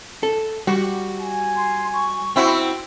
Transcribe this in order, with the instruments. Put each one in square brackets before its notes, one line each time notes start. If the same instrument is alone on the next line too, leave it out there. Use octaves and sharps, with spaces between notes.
[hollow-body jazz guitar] A4
[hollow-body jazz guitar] G3 [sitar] F#4 [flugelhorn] G4
[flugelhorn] G#5
[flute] C6
C#6
[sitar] C4 E4 F#4 [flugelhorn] G5